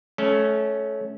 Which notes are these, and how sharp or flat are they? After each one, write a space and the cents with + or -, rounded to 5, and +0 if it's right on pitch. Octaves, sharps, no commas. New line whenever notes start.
A3 -25 C#4 +0